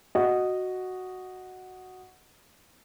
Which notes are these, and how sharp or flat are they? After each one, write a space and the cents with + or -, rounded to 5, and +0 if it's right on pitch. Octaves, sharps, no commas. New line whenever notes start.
F#4 +0 D#5 -10